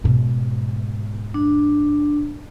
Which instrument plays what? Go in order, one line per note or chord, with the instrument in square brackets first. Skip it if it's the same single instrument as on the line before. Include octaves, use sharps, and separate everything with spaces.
[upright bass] G#2 B2
[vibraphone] D4